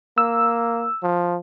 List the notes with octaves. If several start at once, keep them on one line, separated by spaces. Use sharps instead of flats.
A#3 E6
F3